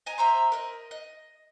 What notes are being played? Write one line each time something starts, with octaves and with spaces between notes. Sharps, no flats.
D#5 G#5 A#5
C5 E5 A#5 C6
A#4 D#5
D#5